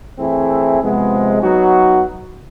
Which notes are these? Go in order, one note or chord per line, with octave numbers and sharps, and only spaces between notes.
E3 A3 C4 E4 G#4
C3 F3 G#3 B3
F#3 B3 D#4 F#4